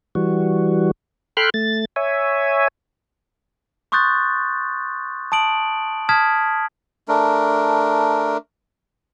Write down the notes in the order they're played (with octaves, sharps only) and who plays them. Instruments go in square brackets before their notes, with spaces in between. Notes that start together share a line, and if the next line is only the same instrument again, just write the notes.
[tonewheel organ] E3 G3 F#4
A4 G5 B5 C6 F6 F#6
A3 A6
C#5 E5 G#5
[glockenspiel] C6 C#6 D#6 F#6 G6 A6
A5 D#6 D7 F#7
A5 D#6 F6 G#6 B6
[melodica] A3 D4 A#4